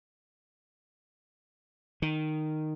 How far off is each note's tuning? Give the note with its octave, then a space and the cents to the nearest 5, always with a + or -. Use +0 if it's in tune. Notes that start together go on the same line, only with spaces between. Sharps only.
D#3 -10